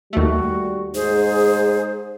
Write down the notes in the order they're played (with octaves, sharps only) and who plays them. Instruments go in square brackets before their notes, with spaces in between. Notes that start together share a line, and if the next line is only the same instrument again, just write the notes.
[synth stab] D#2 A3 [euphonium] G3 [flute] F#4
[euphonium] G#2 [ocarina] G#4 [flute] C5